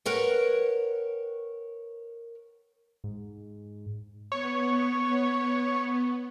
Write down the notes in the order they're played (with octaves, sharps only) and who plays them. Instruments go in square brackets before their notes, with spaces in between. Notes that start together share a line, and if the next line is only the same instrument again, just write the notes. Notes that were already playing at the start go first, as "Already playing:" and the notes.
[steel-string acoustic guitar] A#4 B4 C#5 F#5 G5
[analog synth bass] G#2
[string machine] B3 [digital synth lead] C#5